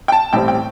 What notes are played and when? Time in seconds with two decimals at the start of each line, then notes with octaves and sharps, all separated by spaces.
0.08 G5
0.12 A5
0.33 A1 A2 G3 C4 G5
0.48 G5